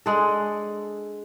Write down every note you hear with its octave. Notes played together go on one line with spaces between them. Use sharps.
G#3 D4 G#4 A4